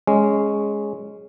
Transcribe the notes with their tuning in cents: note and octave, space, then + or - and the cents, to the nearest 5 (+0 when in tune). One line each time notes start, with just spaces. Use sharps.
G#3 +0 C#4 +0